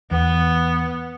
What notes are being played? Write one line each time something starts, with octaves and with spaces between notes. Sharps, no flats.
E2 B3